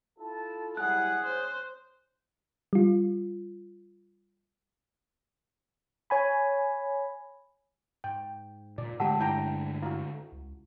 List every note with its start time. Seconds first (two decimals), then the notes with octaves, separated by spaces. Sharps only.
0.18 E4 F4 A4 A5
0.77 F#3 G3 E4 G#4 F#5 F#6
1.26 C5 C#5
2.73 G3 F4
6.10 C#5 G#5 B5
8.04 G#2 G5
8.78 A#2 D5
9.00 G#2 D3 G#3 A3 G4 F#5 A5 E6
9.20 G2 E4 G5 A#5
9.82 E4 F#4 F5
10.32 C#2